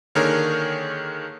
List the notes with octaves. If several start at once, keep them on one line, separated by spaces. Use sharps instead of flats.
D3 D#3 A#3 G#4 A#4 C#5